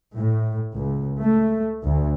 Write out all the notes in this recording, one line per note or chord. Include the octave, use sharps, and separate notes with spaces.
A2
C#2
A3
D2